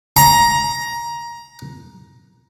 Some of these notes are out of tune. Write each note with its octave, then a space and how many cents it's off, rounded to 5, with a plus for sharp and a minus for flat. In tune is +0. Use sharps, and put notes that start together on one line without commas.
A#5 +15